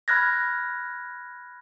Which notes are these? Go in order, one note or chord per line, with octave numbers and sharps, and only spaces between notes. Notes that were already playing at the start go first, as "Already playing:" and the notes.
B5 F6 F#6 G#6 A#6